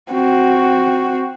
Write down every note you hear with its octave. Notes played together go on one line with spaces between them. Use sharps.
C4 F#4